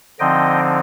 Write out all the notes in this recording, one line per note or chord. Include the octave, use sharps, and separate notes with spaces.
D3 F3 C4 D#4 D#5 G5